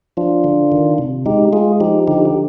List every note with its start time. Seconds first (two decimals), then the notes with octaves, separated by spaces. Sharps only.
0.17 F3 D4 F4
0.44 D3
0.72 D#3
0.98 C3
1.26 G#3 D#4 G4
1.53 G#3 F4 G#4
1.80 F3 D#4 G4
2.07 D3 D#4 G4
2.25 G4